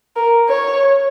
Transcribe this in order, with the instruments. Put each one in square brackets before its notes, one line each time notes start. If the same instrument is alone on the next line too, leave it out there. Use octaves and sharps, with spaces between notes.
[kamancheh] A#4
C#5